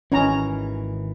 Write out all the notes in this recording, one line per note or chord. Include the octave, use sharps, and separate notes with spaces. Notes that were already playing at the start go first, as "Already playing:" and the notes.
G#1 D#3 E3 C#4 A#5